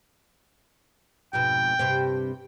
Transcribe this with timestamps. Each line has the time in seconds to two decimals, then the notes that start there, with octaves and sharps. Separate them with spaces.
1.33 F2 G#2 B2 G5
1.79 G2 C3 C4